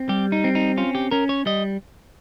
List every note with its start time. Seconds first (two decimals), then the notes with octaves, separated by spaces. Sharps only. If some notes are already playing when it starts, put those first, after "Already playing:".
Already playing: C4
0.09 G3 G4
0.32 D#4
0.44 C4
0.55 D#4
0.77 C#4 F4
0.95 G4
1.11 C#4 A#4
1.29 C#5
1.46 G3 D#5